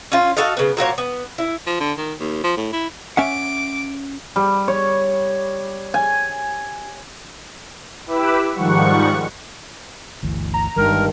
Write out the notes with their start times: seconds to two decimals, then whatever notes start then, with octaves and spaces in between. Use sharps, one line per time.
0.12 C#4 F4
0.37 F#4 A4 D#5 F5
0.57 C#3 B3
0.77 A#2 F#3 A#3 C#5
0.98 B3
1.38 E4
1.67 F3
1.80 D3
1.98 D#3
2.20 D#2
2.44 F3
2.57 A2
2.73 E4
3.17 C#4 E5 F#5 D6
4.36 G3
4.68 C#5
5.94 G#5
8.06 E4 G4 B4 B5 D6 E6
8.54 G#2 D#3 F3 G3 F#5 C#6
10.23 G1 D2 E3
10.54 A#5
10.76 G1 G2 D#3 G3 G#3 A#4